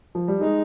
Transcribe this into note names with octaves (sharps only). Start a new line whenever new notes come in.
F3
G3
G#3 D#4